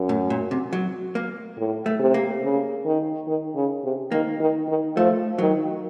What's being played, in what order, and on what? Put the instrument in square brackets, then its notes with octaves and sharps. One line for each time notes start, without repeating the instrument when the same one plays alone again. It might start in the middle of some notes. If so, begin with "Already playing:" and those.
Already playing: [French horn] F#2
[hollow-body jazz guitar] A2
A#2
C3
F#3
A#3
[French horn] A2
[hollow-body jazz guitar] A3
[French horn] C3
[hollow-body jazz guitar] A#3
[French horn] C#3
D#3
D#3
C#3
C3
[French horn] D#3 [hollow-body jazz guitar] A#3
[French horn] D#3
D#3
[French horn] F3 [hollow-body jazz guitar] A3
[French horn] D#3 [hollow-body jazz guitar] F#3